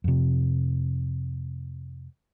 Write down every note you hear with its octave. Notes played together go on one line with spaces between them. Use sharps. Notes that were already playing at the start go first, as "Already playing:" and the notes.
F2 C3